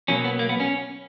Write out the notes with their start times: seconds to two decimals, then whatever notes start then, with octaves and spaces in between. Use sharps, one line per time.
0.08 B2 F#3 A#3 C#4
0.25 B3
0.39 A#3
0.49 B3
0.60 C#4